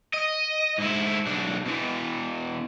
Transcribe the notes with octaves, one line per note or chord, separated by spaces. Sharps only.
D#5
G#2 E4
B1 D4
B2 E3